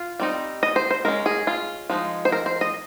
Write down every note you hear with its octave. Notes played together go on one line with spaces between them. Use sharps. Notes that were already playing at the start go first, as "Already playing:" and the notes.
Already playing: F4
G3 C4 D#4
D#5
C5
C5
G#3 C#4 A#4
G#4
F4
F3 G#3 D#4
C5
A#4
C5
D#5